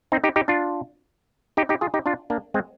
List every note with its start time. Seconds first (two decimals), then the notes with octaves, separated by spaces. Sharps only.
0.12 C4 D#4
0.24 D#4 G4
0.36 D#4 G4
0.48 D4 F4
1.57 D#4 G4
1.69 D#4 G4
1.81 F4 G#4
1.94 D#4 G4
2.06 D4 F4
2.30 A#3 D4
2.54 G#3 C4